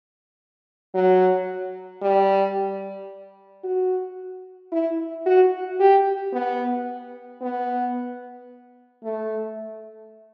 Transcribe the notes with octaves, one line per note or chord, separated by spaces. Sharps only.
F#3
G3
F#4
E4
F#4
G4
B3
B3
A3